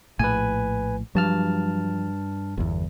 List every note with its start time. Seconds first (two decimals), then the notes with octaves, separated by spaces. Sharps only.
0.19 A#1 A2 B4 G#5
1.15 G2 F3 F#3 A5 F6
2.58 G1 E2